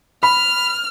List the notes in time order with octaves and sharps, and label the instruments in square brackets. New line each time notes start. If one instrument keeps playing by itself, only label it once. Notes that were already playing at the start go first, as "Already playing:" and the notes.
[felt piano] B5 [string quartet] F6